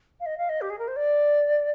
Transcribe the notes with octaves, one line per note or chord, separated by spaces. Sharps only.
F5
D#5
F5
D#5
G4
G#4
A#4
C5
D5